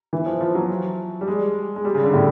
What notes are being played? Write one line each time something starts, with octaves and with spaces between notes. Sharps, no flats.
E3
F3
F3
F#3
G3
G#3
G#3
G3
C#3
D3
A2